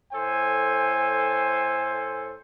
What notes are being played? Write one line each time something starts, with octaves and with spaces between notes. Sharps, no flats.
A2 A4 C5 G#5